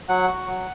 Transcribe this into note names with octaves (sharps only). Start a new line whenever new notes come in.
F#3 F#5
F#4
F#3